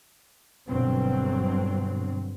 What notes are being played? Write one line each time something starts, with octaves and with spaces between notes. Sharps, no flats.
G1 G2 B2 F#3 C4